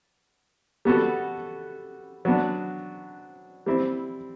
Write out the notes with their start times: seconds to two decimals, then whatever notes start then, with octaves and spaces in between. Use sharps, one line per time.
0.85 G3 B3 F#4 A4
2.25 F#3 B3 D4
3.66 G3 C4 E4